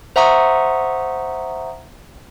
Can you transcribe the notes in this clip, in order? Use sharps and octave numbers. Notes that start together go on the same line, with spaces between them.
C5 E5 F#5 A#5 C#6 D#6